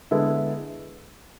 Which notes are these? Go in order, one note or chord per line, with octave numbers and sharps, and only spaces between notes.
D3 G#3 B3 E4 A4